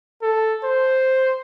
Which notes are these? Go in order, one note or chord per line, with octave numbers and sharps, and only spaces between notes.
A4
C5